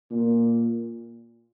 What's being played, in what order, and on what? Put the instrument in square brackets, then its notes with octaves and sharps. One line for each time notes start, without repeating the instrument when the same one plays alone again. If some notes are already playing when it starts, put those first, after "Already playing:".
[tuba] A#2